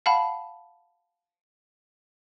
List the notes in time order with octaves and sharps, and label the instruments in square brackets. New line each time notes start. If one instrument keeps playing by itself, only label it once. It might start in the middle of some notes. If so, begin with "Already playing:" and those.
[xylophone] F5 F#5 A5 B5